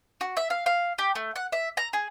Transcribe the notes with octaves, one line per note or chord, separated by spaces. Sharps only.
F#4
E5
F5
F5
G4
A3
F#5
E5
A#5
G#4